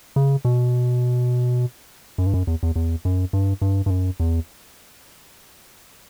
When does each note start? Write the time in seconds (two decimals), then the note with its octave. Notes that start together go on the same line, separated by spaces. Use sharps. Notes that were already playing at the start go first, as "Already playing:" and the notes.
0.16 C#3
0.45 B2
2.18 F#2
2.26 G2
2.34 F#2
2.47 E2
2.63 E2
2.76 E2
3.05 F#2
3.33 G2
3.62 G2
3.86 G2
3.90 F#2
4.20 E2